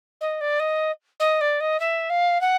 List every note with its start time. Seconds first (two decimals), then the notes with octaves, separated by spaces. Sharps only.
0.21 D#5
0.41 D5
0.60 D#5
1.20 D#5
1.41 D5
1.60 D#5
1.80 E5
2.10 F5
2.41 F#5